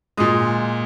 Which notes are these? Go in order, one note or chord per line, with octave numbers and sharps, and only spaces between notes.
A#2 G#3 D#6